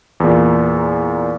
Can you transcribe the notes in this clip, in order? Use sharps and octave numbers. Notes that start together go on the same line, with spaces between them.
E2 A#2